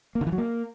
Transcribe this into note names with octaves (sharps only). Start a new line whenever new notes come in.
A#3
D3
E3
F#3
A#3